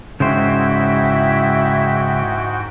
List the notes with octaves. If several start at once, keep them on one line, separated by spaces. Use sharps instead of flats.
G#2 C#3 G#3 E4 F#4 C5 E5 G5